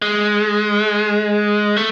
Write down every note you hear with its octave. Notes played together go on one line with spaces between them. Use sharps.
G#3
A3